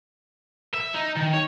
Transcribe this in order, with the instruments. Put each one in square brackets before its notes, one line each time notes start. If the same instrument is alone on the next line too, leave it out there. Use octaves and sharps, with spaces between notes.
[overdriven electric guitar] E5
D#4
D#3
C#5